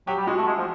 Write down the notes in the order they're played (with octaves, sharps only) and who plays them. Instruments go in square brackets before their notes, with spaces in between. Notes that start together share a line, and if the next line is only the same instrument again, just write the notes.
[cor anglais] F#3 [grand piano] G4
[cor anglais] G3
[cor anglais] G#3 [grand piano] F#4
[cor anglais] A3
G#3
F3